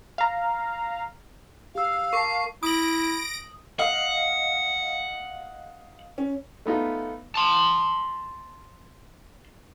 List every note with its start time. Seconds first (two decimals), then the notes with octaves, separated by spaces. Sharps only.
0.18 F5 A#5
1.75 G4 F5 E6
2.13 A#4 A5 C#6 D6 C7
2.63 E4 D#6 A#6 D7 F#7
3.79 D#5 F5 F#5
6.18 C#4
6.66 A3 B3 D#4 F4
7.36 A5 C6